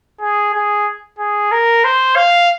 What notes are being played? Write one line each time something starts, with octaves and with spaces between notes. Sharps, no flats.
G#4
G#4
G#4
A#4
C5
F5